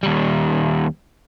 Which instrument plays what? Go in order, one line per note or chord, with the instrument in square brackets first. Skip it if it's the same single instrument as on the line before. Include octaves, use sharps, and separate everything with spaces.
[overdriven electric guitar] D#2 G3